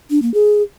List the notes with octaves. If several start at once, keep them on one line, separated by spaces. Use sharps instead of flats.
D4
A#3
G#4